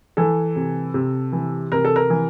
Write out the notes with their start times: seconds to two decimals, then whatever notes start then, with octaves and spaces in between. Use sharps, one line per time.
0.17 E3 A4
0.56 C3
0.94 C3
1.32 E3
1.72 C3 A#4
1.85 A4
1.96 A#4
2.10 E3